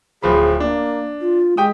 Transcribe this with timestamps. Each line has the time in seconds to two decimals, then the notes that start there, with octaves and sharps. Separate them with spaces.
0.23 D1 F3 G#4 B5
0.60 A#3 D4
1.21 F4
1.57 G#3 G4 G5 D#6